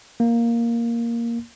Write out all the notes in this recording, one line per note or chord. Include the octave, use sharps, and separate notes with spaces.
A#3